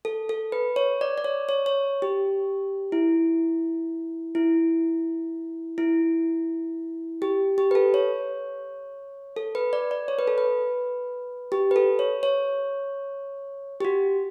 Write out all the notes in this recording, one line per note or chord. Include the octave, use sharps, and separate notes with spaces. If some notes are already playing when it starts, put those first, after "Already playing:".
A4
A4
B4
C#5
D5
D5
C#5
C#5
C#5
G4
E4
E4
E4
G4
G4
B4
A4
C#5
A4
B4
D5
D5
C#5
B4
A4
B4
G4
B4
A4
C#5
C#5
G4
F#4